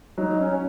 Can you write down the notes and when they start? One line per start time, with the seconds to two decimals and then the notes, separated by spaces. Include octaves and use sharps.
0.18 F#3 D#4
0.39 C#4